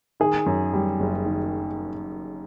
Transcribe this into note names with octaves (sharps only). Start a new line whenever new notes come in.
D#3 G#4
F#2
G3
F#1
D#3